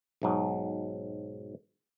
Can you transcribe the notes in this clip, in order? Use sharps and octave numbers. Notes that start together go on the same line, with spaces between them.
B1 G#2 F#3